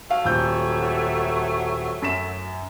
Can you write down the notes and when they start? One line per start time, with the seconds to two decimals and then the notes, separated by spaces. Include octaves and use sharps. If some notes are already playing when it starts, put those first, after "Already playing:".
0.10 F#3 A3 F5
0.24 D#1 E6 G6
2.02 F#2 B6 E7